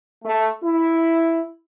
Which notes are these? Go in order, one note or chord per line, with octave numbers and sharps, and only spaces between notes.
A3
E4